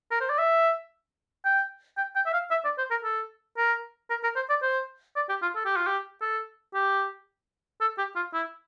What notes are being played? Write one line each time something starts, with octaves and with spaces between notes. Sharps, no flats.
A#4
C5
D5
E5
G5
G5
G5
E5
F5
E5
D5
C5
A#4
A4
A#4
A#4
A#4
C5
D5
C5
D5
G4
F4
A4
G4
F4
G4
A4
G4
A4
G4
F4
E4